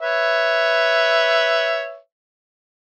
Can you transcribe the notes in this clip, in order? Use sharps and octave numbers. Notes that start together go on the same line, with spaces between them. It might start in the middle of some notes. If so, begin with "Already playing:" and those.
B4 C#5 E5